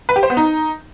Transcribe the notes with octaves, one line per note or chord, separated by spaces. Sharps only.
B4
G4
C5
B3
D#4